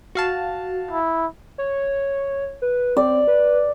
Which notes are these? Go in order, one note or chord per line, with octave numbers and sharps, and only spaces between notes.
F#4 F5 A5
E4
C#5
B4
C4 D5
B4